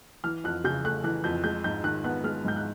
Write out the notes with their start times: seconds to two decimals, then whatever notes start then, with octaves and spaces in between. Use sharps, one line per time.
0.24 E3 F6
0.44 F2 F#6
0.64 C#3 G6
0.84 A3 F#6
1.04 E3 F#6
1.24 F2 G6
1.44 G#3 G6
1.64 G#2 G6
1.84 D#3 F#6
2.04 B3 F#6
2.24 G#3 F6
2.45 G#2 G6
2.56 F#6